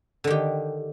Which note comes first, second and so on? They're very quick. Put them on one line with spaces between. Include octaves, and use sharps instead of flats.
D3 D#3 G4